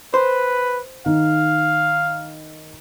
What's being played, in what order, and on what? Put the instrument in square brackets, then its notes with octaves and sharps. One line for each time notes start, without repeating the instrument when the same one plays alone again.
[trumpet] B4 [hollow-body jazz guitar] C5
[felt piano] D#3 [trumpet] F5